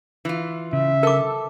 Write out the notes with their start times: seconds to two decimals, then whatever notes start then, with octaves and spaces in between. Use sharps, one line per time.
0.25 E3 F4
0.73 C#3 E5
1.03 A4 A#4 D6